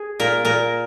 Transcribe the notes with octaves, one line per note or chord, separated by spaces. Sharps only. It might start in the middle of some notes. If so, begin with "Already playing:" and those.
Already playing: G#4
A#2 A#4
A#2 A#4